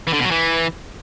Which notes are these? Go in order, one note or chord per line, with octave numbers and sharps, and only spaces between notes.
E3
D3
B2
F#3
E3